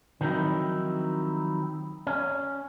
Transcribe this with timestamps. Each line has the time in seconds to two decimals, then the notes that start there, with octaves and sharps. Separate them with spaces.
0.21 D#3 F3 F#3 C4 D#4 E4
2.07 C#4